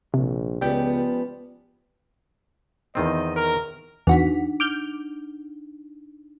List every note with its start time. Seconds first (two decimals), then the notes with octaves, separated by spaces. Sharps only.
0.14 A#1 C3
0.61 C#2 C#3 F3 B3 G4 D5 G5
2.95 E2 D#3 C4 D#5
3.36 A#4
4.07 E2 D4 D#4 F#4 F#5 B6
4.60 D6 F6 G6